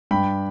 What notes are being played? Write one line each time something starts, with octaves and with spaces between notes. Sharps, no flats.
G2 G5 B5